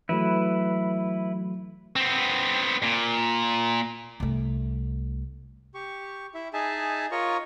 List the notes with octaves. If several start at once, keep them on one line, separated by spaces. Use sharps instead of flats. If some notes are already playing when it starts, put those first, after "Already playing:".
E3 F#3 A3 E4 B4
B3 C4
A#2
C2 A3
G4 C#6
E4 E5
D#4 G#4 E5 G#5 A5
F4 A#4 C#5 D#5 C#6